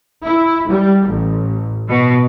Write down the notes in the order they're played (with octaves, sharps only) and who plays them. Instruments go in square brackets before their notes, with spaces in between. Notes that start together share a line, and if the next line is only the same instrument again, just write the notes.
[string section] E4
G3
A1
B2